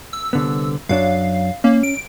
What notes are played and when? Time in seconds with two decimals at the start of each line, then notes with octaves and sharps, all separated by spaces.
0.13 E6
0.33 C2 D3 B3
0.89 F#2 F#3 D4 F5
1.64 A#3 C#4
1.83 D7